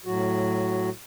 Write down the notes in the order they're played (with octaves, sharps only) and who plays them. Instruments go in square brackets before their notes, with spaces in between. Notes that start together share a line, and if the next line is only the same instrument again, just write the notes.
[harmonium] A2 F#3 F#4